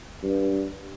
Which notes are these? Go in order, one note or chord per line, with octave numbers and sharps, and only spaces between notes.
G2